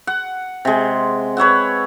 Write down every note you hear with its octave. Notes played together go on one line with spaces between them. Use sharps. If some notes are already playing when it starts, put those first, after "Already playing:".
F#5
C3 G#3
B4 C#5 E5 F#5